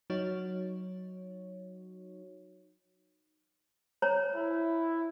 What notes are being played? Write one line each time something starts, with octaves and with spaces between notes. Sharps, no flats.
F#3 D#4 F#4 C#5
C5 C#5 A#5
E4